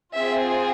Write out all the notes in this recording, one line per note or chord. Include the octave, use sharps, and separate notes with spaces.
C4 F4 G#4 E5